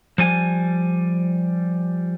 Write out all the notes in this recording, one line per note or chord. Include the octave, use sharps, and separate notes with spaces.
F3 G3 G#5